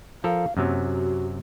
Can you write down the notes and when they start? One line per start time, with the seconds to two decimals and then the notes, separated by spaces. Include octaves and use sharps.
0.24 F3 A4 A#4 F5
0.57 F#2 C3 F#3 A#3
0.84 F#4